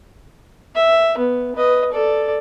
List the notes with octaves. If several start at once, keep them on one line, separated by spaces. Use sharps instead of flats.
E5
B3
B4 D#5
A4 D5